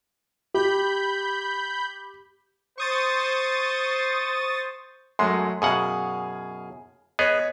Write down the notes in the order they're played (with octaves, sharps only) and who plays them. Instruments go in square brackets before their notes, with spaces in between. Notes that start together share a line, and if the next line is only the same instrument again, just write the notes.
[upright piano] G4 [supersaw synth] B5 G6
[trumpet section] C5 [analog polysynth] C#6 D#6 A6
[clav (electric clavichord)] F#2 G#3 [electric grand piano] F#3 A3 C6
[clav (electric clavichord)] F#2 B2 F#5 [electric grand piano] G#4 F5 G#5
[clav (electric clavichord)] B3 G#4 [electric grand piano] C#5 D#5